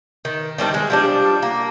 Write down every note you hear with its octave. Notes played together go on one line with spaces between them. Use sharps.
D#3
D#3 G3 C4 D4
G#3
F3 G3 D4
A#3